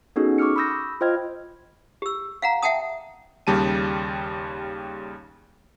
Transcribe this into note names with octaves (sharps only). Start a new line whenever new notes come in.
B3 C#4 D#4 F#4 G#4 A4
C#6 D6 E6 F6 C#7
B5 C#6 D#6 E6 G6 A#6
B5
F4 C5 D#5 G5 F6 G#6
G4 E6
F5 F#5 A#5
E5 F#5 G5 A5 D#6
D#2 C#3 G3 A5 D#7